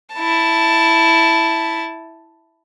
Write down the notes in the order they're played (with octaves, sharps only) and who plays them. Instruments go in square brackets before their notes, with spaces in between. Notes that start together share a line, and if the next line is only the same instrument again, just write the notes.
[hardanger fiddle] E4 A5